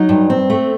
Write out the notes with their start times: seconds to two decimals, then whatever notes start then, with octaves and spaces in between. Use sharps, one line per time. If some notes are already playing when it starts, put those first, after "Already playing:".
Already playing: F#3 D#4
0.09 G2
0.30 C4
0.50 A3